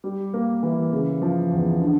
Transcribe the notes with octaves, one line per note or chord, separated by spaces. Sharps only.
G3
A#3
E3
C#3
F3
E2
D3